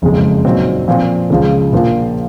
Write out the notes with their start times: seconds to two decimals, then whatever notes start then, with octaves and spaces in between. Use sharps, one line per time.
0.02 F#1 F2 C#3 G#3
0.45 A#2 F#3 C4 D#4
0.88 A#2 F3 C4
1.30 C#2 C#3 F3
1.72 A#1 A#2 F3 A#3 F4